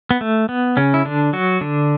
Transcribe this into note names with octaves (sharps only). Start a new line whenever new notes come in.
B3
A3
B3
C#3 C#4
E4
D3 D4
F#3 F#4
D3 D4